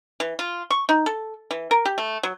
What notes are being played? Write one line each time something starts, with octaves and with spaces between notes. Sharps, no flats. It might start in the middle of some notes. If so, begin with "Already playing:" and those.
E3
F4
C#6
D#4
A4
E3
A#4
G4
A3
F#3